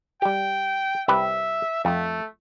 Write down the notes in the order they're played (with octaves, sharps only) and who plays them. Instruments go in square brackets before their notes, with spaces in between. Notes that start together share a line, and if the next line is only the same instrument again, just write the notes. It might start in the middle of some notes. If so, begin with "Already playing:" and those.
[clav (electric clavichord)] G3 G4 [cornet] G5
[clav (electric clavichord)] C2 G4 B4 [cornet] E5
[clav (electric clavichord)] F2 [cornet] A3